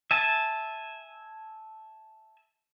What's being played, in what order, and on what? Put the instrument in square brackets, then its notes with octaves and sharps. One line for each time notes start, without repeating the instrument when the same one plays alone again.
[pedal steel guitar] E5 G#5 A5